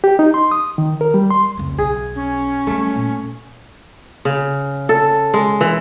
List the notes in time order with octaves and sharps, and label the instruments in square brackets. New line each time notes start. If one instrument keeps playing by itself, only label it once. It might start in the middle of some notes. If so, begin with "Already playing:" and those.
[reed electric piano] G4
D#4
C6
D#6
D#3
A#4
G3
C6
[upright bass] F1 C#2
[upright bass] B1 [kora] G#4
[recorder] C#4
[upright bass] G3 D#4 [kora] A3
[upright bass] A#2
[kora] C#3
A4
G#3
E3